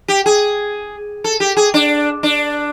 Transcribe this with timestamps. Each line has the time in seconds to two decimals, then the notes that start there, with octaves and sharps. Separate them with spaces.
0.08 G4
0.26 G#4
1.24 A4
1.40 G4
1.57 G#4
1.74 D4
2.23 D4